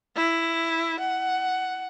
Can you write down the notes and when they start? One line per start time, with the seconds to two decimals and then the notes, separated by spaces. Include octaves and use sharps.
0.16 E4
1.00 F#5